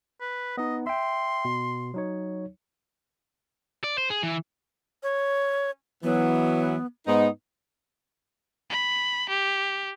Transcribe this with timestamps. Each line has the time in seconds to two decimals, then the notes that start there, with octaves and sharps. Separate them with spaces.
0.20 B4
0.57 B3 D#4 D#5
0.87 E5 G5 C6
1.45 B2
1.94 F#3 D#4 C#5
3.84 D5
3.98 C5
4.10 G#4
4.23 E3
5.03 C#5
6.03 E3 F#3 B3
7.07 G#2 B3 D#4
8.70 B5
9.29 G4